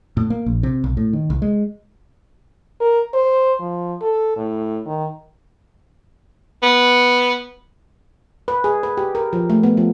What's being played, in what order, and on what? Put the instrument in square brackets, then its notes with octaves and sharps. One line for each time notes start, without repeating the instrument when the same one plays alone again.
[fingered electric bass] A2
A#3
A#1
C3
B1
A2
D#3
C2
G#3
[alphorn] A#4
C5
F3
A4
A2
D#3
[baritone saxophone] B3
[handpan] B4
G#4
B4
G4
A#4
F3
A3
B3
F3